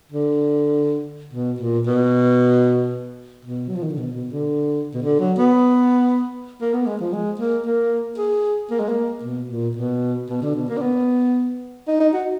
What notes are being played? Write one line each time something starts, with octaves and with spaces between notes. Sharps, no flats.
D3
B2
A#2
B2
B2
F#3
F3
D#3
D3
B2
B2
D3
B2
D3
F#3
B3
A#3
B3
G#3
F3
G#3
A#3
A#3
G#4
A#3
G#3
A#3
B2
A#2
B2
B2
D3
B2
A#3
D4
B3
D#4
D#4
F#4